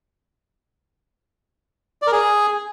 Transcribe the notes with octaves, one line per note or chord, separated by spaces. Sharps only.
D5
A#4
G#4